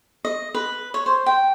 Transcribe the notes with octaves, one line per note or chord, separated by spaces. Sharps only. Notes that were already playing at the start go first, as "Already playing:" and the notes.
D#5
B4
C#5
C5
G5